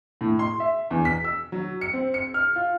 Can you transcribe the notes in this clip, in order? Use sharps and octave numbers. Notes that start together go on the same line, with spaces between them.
A2
C6
E5
E2
B6
E6
F#3
C#7
C4
C#7
F6
F4